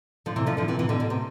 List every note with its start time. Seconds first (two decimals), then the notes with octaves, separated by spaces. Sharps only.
0.26 D3 F3
0.36 C3 E3
0.46 D3 F3
0.57 D3 F3
0.68 C3 E3
0.79 C3 E3
0.89 B2 D3
1.00 B2
1.10 C3